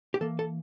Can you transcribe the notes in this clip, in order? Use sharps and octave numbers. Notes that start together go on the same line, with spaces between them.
G4
E3 A#3 A4
A4